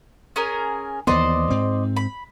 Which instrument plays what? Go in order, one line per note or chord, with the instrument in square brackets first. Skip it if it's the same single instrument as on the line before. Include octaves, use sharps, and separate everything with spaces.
[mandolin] C#4 G#4 A#4
[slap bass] D#2 E3 B3 [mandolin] C5 D5 D#5
[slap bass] G#2 C4
[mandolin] B5